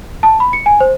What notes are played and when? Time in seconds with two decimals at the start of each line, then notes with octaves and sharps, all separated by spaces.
0.23 A5
0.40 B5
0.53 C#7
0.66 G#5
0.80 C5